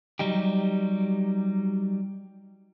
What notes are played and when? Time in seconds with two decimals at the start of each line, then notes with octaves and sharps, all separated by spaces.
0.19 F#3 G3 D#4 G4